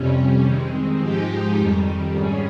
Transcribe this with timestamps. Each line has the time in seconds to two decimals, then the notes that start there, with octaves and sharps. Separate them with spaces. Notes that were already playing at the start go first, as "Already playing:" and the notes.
Already playing: F2 C3 G3 C#4
0.44 D#3 G#3 C4
1.00 G#2 F3 G#3 D#4 G4
1.57 F2 D#3 G3
2.14 G#2 G3 C#4 G#4